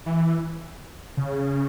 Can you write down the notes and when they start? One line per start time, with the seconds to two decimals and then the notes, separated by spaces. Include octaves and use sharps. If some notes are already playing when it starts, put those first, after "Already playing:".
0.06 E3
1.17 C#3